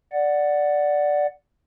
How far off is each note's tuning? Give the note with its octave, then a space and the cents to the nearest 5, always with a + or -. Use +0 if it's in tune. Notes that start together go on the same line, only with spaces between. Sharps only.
D5 +0 F#5 +0